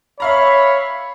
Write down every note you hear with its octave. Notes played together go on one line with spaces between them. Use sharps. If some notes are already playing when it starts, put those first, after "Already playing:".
C#5 E5 F5 A#5 B5